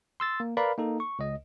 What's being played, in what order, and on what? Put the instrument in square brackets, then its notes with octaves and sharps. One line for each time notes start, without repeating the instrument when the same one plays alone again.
[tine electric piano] C6 E6 A6
A#3
A#4 B4 D5 F5 B5
A#3 D#4 A4
C#6
C#2 D#5